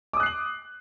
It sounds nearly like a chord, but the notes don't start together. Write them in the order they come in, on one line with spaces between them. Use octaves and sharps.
D6 D#6 F#6 C7 F#7